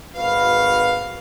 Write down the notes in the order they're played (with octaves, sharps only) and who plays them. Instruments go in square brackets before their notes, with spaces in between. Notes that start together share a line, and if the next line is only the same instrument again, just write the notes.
[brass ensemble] G#1 F#4 F5 [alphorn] B4